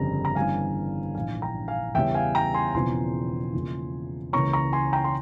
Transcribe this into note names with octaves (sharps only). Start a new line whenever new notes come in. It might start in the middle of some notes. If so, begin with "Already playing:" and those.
Already playing: G1 F2 C#3 G3 A#5
A#5
G1 G2 E3 G3 C#4 F5 G#5
A#1 G#2 E3 F5 G#5
G5 A#5
F5 G#5
E2 C#3 G3 C#4 E5 G5
F5 G#5
G5 A#5
G#5 C6
E1 E2 C#3 F3 C4 G#5 C6
E1 E2 C#3 F3 A#3
C#2 C#3 E3 A#3 C#4 A#5 C#6
A#5 C#6
G#5 C6
G5 A#5
C6